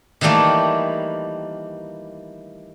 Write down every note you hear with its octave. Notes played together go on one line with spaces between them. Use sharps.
D#3 E3 G3 A3 A#3